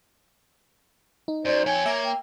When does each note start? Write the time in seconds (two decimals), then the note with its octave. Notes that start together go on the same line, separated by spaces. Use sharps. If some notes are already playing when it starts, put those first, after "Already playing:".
1.28 D#4
1.45 F#2 C5 D5
1.66 F3 C#5 G5 G#5
1.86 A#3 E5
2.05 G5